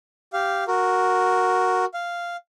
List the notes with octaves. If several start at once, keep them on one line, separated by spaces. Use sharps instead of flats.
G4 F5
F#4 A#4
F5